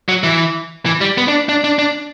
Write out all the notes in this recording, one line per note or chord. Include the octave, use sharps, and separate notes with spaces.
F#3
E3
E3
G3
B3
D4
D4
D4
D4